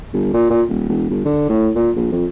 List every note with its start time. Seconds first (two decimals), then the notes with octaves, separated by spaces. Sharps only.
0.13 G1
0.34 A#2
0.50 A#2
0.68 D#1
0.89 E1
1.10 G1
1.25 D3
1.49 A2
1.75 A#2
1.96 A#1
2.12 F2